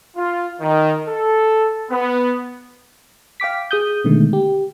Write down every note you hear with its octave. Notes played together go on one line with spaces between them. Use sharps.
F4
D#3
A4
B3
F5 G5 D6 B6
G#4 D#6 G6
B2 D3 D#3 G#3 A3
G4